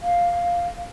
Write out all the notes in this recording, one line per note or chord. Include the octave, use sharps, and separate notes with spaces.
F5